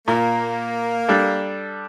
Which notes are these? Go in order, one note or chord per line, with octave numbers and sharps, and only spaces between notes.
A#2 A#3
G3 D4 A4